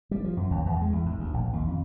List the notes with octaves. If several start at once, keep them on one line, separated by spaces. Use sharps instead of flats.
G3
F3
F#2
D#2
E2
G#3
E2
G#2
D2
A#1
D#2
F2